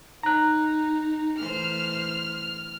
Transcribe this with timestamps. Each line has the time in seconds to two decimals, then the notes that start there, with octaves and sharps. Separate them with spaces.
0.23 D#4 A#5 F#6
1.38 E3 A3 C5 F6